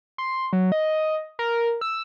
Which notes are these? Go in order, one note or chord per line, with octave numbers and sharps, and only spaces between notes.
C6
F#3
D#5
A#4
E6